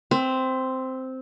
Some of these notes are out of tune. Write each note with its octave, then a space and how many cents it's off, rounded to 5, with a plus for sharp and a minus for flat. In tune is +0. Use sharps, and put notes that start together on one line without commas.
C4 -5 E5 +25